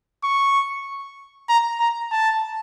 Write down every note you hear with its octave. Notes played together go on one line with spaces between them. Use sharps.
C#6
A#5
A#5
A5